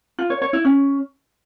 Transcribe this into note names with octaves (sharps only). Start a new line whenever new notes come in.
F4
C#5
C#5
E4
C#4